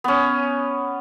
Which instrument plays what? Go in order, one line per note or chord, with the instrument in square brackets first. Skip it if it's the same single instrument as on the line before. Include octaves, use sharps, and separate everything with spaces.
[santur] B3 C#4